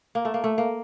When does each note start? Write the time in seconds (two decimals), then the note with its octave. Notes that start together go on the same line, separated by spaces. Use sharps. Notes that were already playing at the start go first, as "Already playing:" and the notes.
0.15 A#3
0.25 A3
0.34 A#3
0.44 A3
0.58 A#3